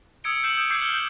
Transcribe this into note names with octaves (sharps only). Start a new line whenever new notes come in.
D#6 E6 G#6 C#7 D7 G7
E6 G6 C7 C#7 E7 F#7
D#6 G6 D7 E7
D6 E6 G6 G#6 C7 C#7
F6 G7
G6